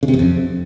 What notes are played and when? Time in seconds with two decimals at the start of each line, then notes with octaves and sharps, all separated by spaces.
0.03 C#3
0.08 C3
0.14 E2
0.19 F2